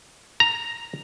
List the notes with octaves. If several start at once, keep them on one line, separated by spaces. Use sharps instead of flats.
A#5